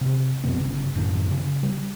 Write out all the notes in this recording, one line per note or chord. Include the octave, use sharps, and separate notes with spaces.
C3
F#2 B2 C4
G1 C#3
F#2 A2 D#3
C#3 C#4
G3